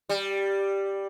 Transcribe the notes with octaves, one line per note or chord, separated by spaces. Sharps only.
G3